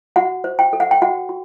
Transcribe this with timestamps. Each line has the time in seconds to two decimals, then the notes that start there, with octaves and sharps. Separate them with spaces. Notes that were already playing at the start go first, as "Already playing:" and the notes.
0.16 F#4 F#5
0.44 C5
0.59 G5
0.73 A4
0.80 F#5
0.91 G5
1.02 F#4 F#5
1.29 F#4